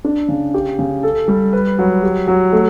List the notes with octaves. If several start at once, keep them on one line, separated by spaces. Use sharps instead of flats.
D4
C#3
G4
C#3
A4
G3
B4
F#3
G4
F#3
A3